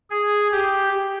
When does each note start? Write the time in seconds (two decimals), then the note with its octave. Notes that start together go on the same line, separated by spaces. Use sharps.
0.10 G#4
0.52 G4